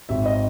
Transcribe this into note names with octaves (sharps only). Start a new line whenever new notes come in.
G#1 E5
D#5